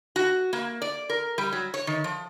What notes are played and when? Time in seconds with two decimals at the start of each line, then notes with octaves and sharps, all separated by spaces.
0.16 F#4
0.53 A#3
0.82 D5
1.10 A#4
1.38 G3
1.52 F#3
1.74 C#5
1.87 D#3
2.04 F3